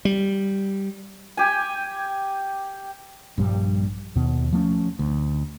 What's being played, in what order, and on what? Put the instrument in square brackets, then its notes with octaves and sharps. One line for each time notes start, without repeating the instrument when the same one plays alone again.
[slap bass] G3
[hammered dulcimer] G4 G#5
[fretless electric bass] A#1 G2 G3
D#2 B2
F3 A3 C4 C#4
D2